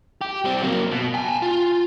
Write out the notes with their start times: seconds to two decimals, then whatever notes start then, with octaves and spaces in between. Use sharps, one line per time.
0.21 G4
0.45 G3 C4
0.63 F#3 A#3
0.92 B2
1.14 G5 G#5
1.42 F4